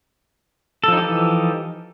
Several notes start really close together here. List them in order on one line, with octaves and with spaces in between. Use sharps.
A4 F3 D#4 G4 E3